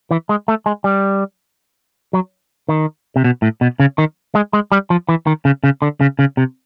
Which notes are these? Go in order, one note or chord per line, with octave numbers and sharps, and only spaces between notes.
E3
G#3
A3
G#3
G3
F#3
D#3
C3
B2
A2
B2
C#3
D#3
G#3
G#3
G3
F3
E3
D#3
C#3
C#3
D3
C#3
C#3
C3